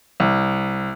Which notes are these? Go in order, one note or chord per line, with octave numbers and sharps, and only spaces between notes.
C2